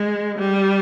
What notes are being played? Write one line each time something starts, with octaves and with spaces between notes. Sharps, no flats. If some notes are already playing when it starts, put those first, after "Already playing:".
Already playing: G#3
G3